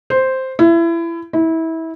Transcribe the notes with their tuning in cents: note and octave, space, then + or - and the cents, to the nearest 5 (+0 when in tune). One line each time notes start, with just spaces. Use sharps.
C5 +0
E4 +25
E4 -25